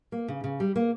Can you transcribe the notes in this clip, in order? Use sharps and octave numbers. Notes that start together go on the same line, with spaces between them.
A#3
C#3
C#3
G3
A#3